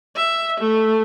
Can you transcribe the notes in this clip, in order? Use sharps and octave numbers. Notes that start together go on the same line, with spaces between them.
E5
A3